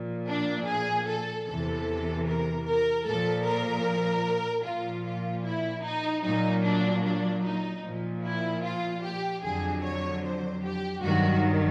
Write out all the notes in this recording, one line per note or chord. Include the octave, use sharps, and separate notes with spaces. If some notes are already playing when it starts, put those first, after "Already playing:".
Already playing: A#2 F3
D4
G#4
A4
E2 C3 E3 A4
A#4
A#4
A#2 F3 A4
A#4
A#2 F3 F4
F4
E4
D#4
A#2 F#3 D#4
D4
D4
D#4
A#2 F3
E4
F4
G4
F2 D3 F#3 G#4
C#5
C5
G4
G2 D#3 F#3 F#4